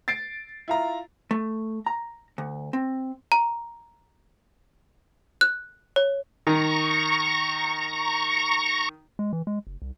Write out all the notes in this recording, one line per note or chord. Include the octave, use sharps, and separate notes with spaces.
A6 C7 D7
E4 F4 A#5
A3
A#5
D2
C4
A#5
F#6
C#5
D#3 A#5 C#6
G#3
E3
G#3
F#1
C2